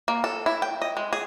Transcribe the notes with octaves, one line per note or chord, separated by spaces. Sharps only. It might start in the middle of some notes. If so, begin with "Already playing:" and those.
A#3
A4
E4
G5
D#5
G#3
G#4